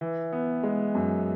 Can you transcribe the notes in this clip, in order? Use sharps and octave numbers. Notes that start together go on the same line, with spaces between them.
E3
B3
G#3
F#2